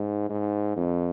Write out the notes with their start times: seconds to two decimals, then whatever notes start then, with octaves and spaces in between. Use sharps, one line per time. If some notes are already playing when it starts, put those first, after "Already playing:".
Already playing: G#2
0.30 G#2
0.77 F2